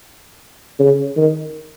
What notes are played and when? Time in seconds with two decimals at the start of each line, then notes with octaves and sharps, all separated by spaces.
0.79 C#3
1.17 D#3